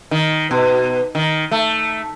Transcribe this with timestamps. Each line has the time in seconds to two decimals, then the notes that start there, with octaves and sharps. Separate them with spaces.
0.11 D#3
0.51 B2
1.15 D#3
1.51 A3